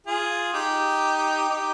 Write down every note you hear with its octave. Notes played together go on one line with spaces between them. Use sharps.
F4 G#4
D#4 G4
D#4 G4